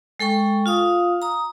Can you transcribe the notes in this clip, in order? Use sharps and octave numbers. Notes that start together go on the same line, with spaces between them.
G#3 A4 G5 C#6
F4 F5 D#6
A#5 D#6